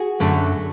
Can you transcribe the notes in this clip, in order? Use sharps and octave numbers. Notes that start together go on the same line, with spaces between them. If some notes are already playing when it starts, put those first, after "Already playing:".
Already playing: F#4 G#4
F#2 D3 F#3 A3